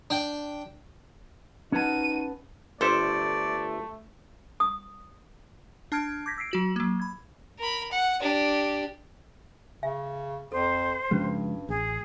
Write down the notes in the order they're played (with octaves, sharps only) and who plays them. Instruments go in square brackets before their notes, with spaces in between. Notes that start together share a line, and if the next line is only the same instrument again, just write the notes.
[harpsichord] D4 G5
[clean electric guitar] C#4 B4 A5 [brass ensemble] D#4 [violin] F#4 D#7
[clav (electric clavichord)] G1 A4 E5 [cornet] A3 [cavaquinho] C5 [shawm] D5
[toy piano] D#6
[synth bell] D4 A5 F6 G#6 D7
D6 G6 G#6 A#6 B6
E6 B6 C7 D7
F#3 F#4 F#7
F#3 A#3
B5 G#6
[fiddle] A#4 B5
F#5
D4 G4
[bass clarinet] C#3 [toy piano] E5 G#5
[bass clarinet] F2 [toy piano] A4 [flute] C5
[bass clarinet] G2 [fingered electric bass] C#3 F3 G#3 [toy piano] C#4 F#4 B4
[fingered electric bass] A1 [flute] G#4